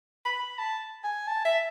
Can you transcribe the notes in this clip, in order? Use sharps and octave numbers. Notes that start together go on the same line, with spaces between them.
B5
A5
G#5
A5
E5